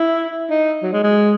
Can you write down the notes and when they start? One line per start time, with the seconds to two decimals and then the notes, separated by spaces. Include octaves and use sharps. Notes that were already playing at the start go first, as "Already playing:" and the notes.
Already playing: E4
0.50 D#4
0.83 F#3
0.93 G#3
1.04 G#3